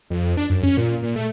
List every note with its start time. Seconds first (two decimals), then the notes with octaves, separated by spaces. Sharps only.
0.10 F2
0.37 D4
0.50 F#2
0.63 C#4
0.77 A#2
1.02 A#2
1.16 A3